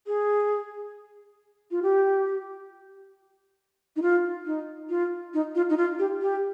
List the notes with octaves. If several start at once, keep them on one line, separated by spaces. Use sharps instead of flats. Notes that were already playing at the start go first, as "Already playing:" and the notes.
G#4
F4
G4
D#4
F4
D#4
F4
D#4
F4
D#4
F4
G4
G4